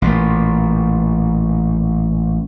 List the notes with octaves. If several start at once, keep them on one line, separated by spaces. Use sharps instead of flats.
A1 A#2